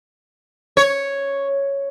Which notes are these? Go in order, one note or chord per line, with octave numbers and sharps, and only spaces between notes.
C#5